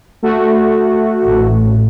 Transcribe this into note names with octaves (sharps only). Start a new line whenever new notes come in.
A3 F#4
A1